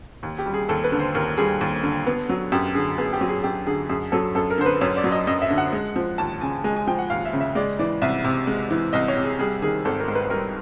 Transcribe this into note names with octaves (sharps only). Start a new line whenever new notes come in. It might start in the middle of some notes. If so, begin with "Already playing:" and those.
D#2
G4
G3
G#4
D#2 A4
B4
D3
C5
D#2 A#4
G3 G#4
D#2
D3
B3
F#3
F#2 G4
D3 G#4
B3 G#4
G4
F#3
G#4
F#2 G4
D3 G#4
F#2 G#4
F#3 A4
F#2 A4
A#4
D3 C5
B4
F#2 C#5
D5
F#3
D#5
F#2 D#5
E5
D3
F#5
G#3
F3
D#2 A5
C#3 G#5
G#3 G#5
G#5
F3 G5
F#5
D#2 F5
E5
C#3
E5
G#3 D5
E3 D5
C2 E5
C3
G#3
E3
C2 D#5
C#5
C3
G#4
G3 G#4
D#3 G#4
G#1 A4
A#4
G#2
B4
G3 A#4